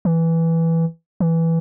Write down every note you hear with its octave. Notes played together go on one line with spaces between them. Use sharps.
E3
E3